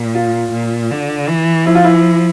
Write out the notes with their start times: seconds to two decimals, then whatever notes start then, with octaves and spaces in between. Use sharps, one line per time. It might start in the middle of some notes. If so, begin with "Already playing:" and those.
Already playing: A#2
0.15 F4
0.52 A#2
0.91 D3
1.29 E3
1.66 F3 E4
1.75 F4
1.84 E4